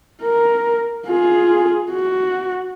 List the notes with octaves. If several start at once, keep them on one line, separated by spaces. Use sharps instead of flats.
A#4
F4 G#4
F#4